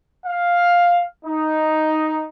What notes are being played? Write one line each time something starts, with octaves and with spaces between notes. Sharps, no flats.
F5
D#4